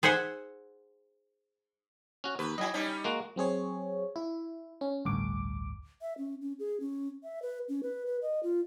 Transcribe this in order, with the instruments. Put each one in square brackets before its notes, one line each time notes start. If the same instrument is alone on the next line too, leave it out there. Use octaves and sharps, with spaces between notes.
[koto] G#4 C5 E5 F#5 G#5
[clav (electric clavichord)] C#4 F#4
[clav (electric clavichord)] D#2 [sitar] B4
[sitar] F#3 E4 [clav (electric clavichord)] D#5 G#5
[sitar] G3 C#4 D#4
[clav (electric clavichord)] G#3 A#3 F#4
[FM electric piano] F#3 C4 G#4 C#5
E4
C#4
A1 D2 G2 D6
[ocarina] E5
C#4
C#4
G#4
C#4
E5
B4
C#4
B4
B4
D#5
F4